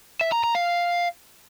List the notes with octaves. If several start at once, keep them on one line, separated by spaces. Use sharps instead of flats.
E5
A#5
A#5
F5